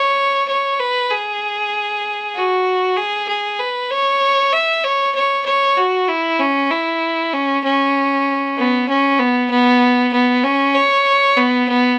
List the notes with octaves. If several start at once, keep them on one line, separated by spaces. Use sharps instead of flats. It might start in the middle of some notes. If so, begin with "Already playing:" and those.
Already playing: C#5
C#5
B4
G#4
F#4
G#4
G#4
B4
C#5
E5
C#5
C#5
C#5
F#4
E4
C#4
E4
C#4
C#4
B3
C#4
B3
B3
B3
C#4
C#5
B3
B3